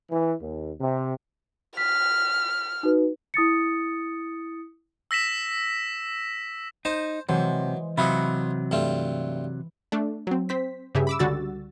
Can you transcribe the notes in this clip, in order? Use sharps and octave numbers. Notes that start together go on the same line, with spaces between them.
E3
D#2
C3
F6 B6
D#4 F#4 B4
E4 D#6 A6 C#7
E6 A#6 B6 E7
D#4 C5 A5
C3 E3 F#3 G#3 C5
C3 F#3 E4 F4 D#5 B5 B6 C#7
G2 A3 F4
A3 D4
F#3 C4
C4 C5 B6
G2 C#3 G4 G#4 E5
B5 D6 E6
C#2 D3 G3 F#4 E6 A6